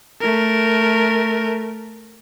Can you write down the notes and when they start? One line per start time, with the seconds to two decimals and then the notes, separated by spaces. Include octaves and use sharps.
0.21 A3 A#4